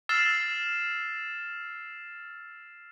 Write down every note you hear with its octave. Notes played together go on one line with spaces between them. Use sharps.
E6 F6 A6 C7 E7